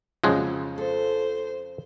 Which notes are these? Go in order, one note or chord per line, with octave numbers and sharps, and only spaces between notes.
F2 C#3 F3 F#3 G#3 F5
A4 C5